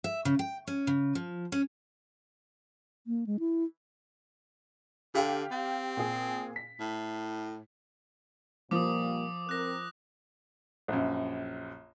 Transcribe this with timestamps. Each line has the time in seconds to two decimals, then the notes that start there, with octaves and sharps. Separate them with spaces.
0.04 E5
0.25 C#3
0.39 G5
0.67 C#4
0.87 C#3
1.15 F3
1.52 C#4
3.07 A#3
3.27 G#3
3.39 E4
5.15 D3 G4 F5 G5
5.52 C4
5.97 A#2 G#4
6.56 B6
6.80 A2
8.71 A#2 F3 G3 A#3 D6 D#6
9.49 C4 A#4 F#6 A#6
10.88 A#1 F#2